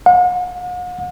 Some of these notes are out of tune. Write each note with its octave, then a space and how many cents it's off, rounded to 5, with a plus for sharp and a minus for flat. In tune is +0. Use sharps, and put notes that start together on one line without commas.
F#5 -45